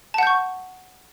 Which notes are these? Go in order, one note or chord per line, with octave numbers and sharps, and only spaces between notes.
F#5 A5 C#6 G6